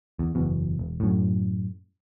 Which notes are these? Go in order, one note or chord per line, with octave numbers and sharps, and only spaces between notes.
E2
F#1 E2 B2
E1
F#2 A2